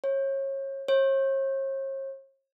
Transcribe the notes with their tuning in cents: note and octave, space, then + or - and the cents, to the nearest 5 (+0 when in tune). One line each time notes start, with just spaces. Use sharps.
C#5 -30
C#5 -45